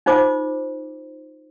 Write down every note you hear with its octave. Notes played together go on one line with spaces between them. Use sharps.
D#4 F4 C5 D6